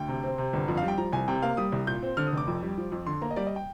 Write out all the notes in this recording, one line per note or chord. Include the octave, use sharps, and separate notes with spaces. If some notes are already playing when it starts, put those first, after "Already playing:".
Already playing: D2 G5
C3
C4
C3
G1
F2
F5
G3
G5
F3 A#5
C2 G#5
C3 G5
A#3 F5
G3 D#6
C2
A#2 G6
C4
D3 F6
D#6
F1
D6
F2
G3
F3
F2
D3 C6
A#3 A#5
D#5
G3 D5
D#5
G5